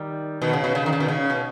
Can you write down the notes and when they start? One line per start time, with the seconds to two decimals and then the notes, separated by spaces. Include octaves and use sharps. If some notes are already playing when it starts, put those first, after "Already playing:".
Already playing: D#3 G3
0.42 B2 D#3
0.53 C#3
0.64 B2
0.75 C#3
0.86 D#3
0.93 C#3
1.00 B2 D#3
1.08 C#3
1.30 B2